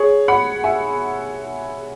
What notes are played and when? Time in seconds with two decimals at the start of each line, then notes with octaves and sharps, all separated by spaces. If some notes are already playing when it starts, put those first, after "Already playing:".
Already playing: G#4 C#5
0.28 F#5 B5
0.64 E5 G#5